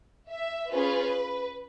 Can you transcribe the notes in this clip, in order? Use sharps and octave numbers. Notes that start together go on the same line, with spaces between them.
E5
C#4 F4 G#4 B4